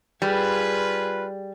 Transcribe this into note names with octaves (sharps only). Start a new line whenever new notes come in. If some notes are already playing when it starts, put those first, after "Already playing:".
G3 F4 G#4 B4